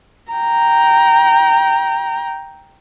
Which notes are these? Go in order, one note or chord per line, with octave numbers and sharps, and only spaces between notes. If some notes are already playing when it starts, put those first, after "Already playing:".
G5 A#5